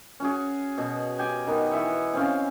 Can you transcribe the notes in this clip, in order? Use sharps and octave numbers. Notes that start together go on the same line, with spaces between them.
C#4 F#4 G#4
B2
G4 G5 G#5
D#3 B3
E3 E5 C#6
C4 C#4 F5